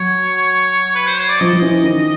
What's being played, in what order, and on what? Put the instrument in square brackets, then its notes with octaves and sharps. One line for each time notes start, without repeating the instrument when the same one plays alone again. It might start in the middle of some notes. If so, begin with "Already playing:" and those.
Already playing: [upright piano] F#3 [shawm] C#5
[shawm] B4
C5
C#5
D5
[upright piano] F3 [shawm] D#5
[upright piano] F3
E3
D#3